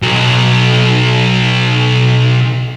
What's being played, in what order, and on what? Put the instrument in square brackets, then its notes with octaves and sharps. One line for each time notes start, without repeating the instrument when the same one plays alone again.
[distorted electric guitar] B1 F#3